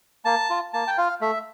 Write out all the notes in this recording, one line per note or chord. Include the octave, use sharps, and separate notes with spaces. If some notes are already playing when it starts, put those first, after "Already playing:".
A#3 A5
F4
A#3 A5
G5
F4 F5
A3 E5